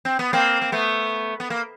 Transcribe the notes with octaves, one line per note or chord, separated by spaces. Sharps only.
C4
B3
A#3 C4
A#3
A3 B3
B3
A#3